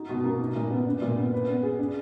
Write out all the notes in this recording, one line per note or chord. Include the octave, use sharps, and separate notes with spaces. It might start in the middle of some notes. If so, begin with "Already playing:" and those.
Already playing: D#4 F#4
B2
A#3
D#4
A#2
B3
D4
A#2
B3
B4
B3
G#4
D4